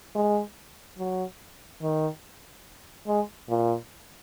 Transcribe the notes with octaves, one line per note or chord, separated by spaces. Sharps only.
G#3
F#3
D#3
G#3
A#2